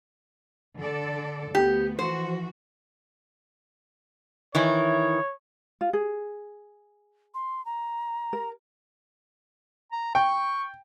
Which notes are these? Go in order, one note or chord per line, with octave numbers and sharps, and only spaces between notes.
D3 A4 D5
D2 B3 G4
E3 F3 F#4 C5
D#3 E3 E4 C#5
F4
G#4
C6
A#5
A#4
A#5
G5 C#6